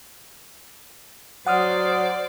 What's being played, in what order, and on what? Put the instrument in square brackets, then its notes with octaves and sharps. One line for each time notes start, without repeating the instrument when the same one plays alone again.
[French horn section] F#3 [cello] C5 [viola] D5 [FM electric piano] F#5 D#6 F6